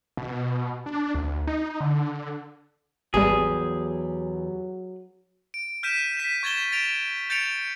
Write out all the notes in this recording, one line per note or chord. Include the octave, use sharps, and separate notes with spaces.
B2
D4
D2
D#4
D3
G#1 E2 F#3 G3 G4 G#4 A5
D7
F6 G6 B6 D#7 E7
B6 D#7 E7
C#6 G#6 A6 E7 G7
A6 D7 F7
G6 A6 C#7 D7 F7